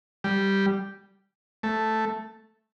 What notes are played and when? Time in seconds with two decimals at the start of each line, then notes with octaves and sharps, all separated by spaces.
0.24 G3
1.63 A3